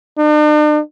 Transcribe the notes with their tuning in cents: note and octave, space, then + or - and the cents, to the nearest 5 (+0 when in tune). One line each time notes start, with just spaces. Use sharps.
D4 +45